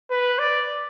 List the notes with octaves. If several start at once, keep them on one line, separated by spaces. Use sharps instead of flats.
B4
D5